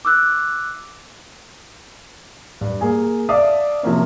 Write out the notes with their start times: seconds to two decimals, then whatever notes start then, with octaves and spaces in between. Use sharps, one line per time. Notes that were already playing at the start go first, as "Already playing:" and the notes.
0.05 D6 E6 F#6
2.61 G2
2.81 A#3 G#4 G#5
3.29 D5 E5 F5 A5 D6 D#6
3.83 C3 F3 A#3 C#4